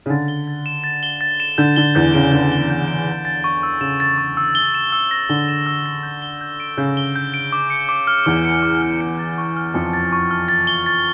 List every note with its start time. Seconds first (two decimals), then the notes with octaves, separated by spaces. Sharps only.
0.06 C#3
0.10 D3 A6
0.28 G7
0.48 A6
0.66 E7
0.84 A6
1.03 G7
1.21 A6
1.40 E7
1.58 D3 G6
1.76 D3 G7
1.95 E2 E3 G6
2.13 C#3 D7
2.32 D3 G6
2.52 G7
2.70 G6
2.88 D7
3.07 E7
3.25 A6
3.44 C#6
3.63 E6
3.80 C#3 E7
4.00 A6
4.18 C#6
4.37 E6
4.55 G7
4.74 E7
4.92 E6
5.11 A#6
5.29 D3 G7
5.48 E7
5.66 E6
5.86 A#6
6.03 G6
6.22 G7
6.41 G6
6.60 D7
6.77 C#3 G6
6.97 G7
7.16 G6
7.34 D7
7.52 D6
7.70 C#7
7.89 D6
8.07 F6
8.26 E2 E3 D6
8.45 C#7
8.63 D6
8.82 F6
9.01 C#7
9.19 A6
9.38 C#6
9.57 F6
9.74 F2 F3 C#7
9.93 A6
10.13 C#6
10.31 F6
10.49 A6
10.67 G7
10.86 A6